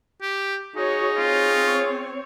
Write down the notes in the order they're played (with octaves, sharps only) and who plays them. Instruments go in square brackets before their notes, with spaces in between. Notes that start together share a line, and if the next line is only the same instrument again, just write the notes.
[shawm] G4
[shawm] D#4 [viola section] F#4 C#5 [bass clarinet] G#4
[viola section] C4 C#5 [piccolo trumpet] F4